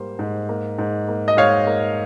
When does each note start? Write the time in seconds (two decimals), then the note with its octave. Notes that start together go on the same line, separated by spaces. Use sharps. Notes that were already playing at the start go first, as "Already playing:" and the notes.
Already playing: G#2 G3 A#3 C5
0.19 G#2
0.49 A#3
0.78 G#2
1.08 A#3
1.28 D#5
1.37 G#2 C#5 F5
1.67 A#3